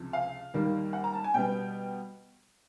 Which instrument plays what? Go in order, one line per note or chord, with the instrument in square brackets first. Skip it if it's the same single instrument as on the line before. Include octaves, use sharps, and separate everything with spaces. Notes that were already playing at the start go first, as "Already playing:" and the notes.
Already playing: [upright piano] C#2 C3 F3
F5
D#2 D#3 G3 A#3
F#5
A#5
A5
G#5
B2 G3 B3 G5